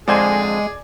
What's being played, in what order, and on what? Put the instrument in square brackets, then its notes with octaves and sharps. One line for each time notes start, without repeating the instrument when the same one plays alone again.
[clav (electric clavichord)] F2 D3 C5 [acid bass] G#3 [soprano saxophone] G#4 [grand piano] D5 G#5